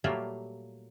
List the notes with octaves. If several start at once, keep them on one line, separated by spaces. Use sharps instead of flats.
A#2 F#3 G3 A3 A#3 F4